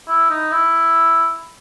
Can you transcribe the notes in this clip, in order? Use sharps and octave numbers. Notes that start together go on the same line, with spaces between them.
E4
D#4
E4